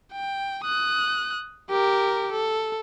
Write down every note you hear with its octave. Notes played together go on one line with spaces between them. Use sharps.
G5
D#6 F#6
G4 A#4
A4